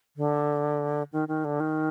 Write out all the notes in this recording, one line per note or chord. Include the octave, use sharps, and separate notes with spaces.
D3
D#3
D#3
D3
D#3